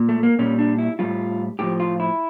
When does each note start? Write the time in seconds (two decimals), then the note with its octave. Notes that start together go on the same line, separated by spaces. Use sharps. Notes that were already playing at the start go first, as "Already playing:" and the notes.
Already playing: A#2
0.09 A3
0.23 A#3
0.39 A#2 G3 C#4
0.59 D4
0.78 E4
0.99 A2 G3 F4
1.59 A2 F3 G4
1.80 F4
2.00 E4